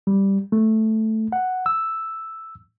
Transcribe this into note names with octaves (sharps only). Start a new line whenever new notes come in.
G3
A3
F#5
E6